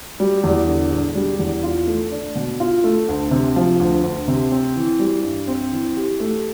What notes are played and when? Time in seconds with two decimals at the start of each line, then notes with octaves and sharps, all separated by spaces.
0.20 G3
0.44 E2
0.67 D3
0.92 E1
1.15 G3
1.39 E2
1.63 F4
1.87 A3
2.11 D4
2.36 B2
2.60 F4
2.84 A3
3.08 D2
3.31 C3
3.56 F3
3.80 D2
4.03 D2
4.28 C3
4.52 C4
4.76 E3
5.00 G3
5.23 G2
5.48 C4
5.72 E3
5.97 G4
6.20 A3